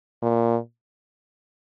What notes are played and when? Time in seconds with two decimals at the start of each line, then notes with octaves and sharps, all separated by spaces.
0.22 A#2